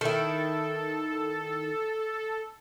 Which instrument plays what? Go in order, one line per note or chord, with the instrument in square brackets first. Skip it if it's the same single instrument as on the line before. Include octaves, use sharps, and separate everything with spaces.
[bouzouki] D#3 E4 [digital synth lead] A4